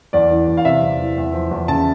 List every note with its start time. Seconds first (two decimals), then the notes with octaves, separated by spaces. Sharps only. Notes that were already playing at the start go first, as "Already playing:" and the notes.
0.13 E2 D5
0.31 E3
0.47 E2
0.57 F5
0.65 C3 E5
0.82 E2
1.00 E3
1.17 E2
1.33 F3
1.51 E2
1.68 C#3 A5